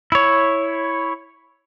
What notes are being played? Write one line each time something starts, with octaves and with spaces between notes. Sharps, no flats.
E4 C#5